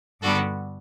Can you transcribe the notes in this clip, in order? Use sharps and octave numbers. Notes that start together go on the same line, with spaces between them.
G2 D3 G3 B3 F#4 A4